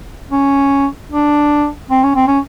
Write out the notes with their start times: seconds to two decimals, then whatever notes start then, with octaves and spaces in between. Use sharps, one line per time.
0.31 C#4
1.11 D4
1.90 C4
2.03 C#4
2.15 C4
2.27 C#4